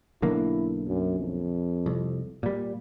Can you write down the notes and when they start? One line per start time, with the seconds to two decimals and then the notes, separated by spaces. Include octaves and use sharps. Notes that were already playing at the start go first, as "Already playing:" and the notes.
0.22 B1 D3 A#3 E4
0.87 F#2
1.19 F2
1.86 C2
2.43 A#2 G3